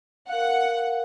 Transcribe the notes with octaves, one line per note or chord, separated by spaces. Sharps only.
A#4 F5 F#5